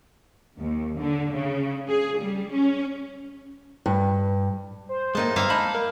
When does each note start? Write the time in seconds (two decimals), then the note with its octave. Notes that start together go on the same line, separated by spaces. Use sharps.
0.58 D#2
0.98 D3
1.33 C#3
1.88 G#4
2.19 G3
2.53 C#4
3.86 G2
4.89 C5
5.15 A2 G#3 A#3 D#4 A5
5.36 G2 A#3 B3 E5 F5
5.50 G#3 D#4 A5 B5
5.75 A#4